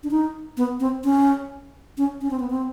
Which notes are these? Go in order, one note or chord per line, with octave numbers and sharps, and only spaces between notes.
D4
D#4
B3
C4
C#4
C#4
C#4
C4
B3
C4